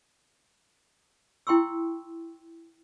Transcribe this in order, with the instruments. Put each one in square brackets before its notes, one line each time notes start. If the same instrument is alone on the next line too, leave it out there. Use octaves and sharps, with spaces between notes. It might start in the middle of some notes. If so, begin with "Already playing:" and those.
[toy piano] E4 G5 C6 C#6 E6